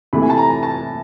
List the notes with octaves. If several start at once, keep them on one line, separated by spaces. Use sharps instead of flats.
C3 E3 A3 B5
G#5
A5
A#5
A5